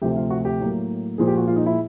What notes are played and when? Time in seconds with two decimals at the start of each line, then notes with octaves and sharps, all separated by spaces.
0.02 D2 C3 F3 A3 G4
0.16 F4
0.31 F#4
0.45 G4
0.60 A2 F#3 A#3
1.18 A#2 F3 G#3 G#4
1.28 G4
1.37 F#4
1.47 F4
1.56 D#4
1.66 E4